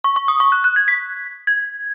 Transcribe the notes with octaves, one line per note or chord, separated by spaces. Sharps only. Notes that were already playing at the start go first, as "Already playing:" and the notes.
C#6
C#6
D#6
C#6
F#6
F#6
G#6
B6
G#6